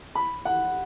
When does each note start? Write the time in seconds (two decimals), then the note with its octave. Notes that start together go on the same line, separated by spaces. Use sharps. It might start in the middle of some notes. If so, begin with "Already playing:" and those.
0.15 B5
0.45 F#5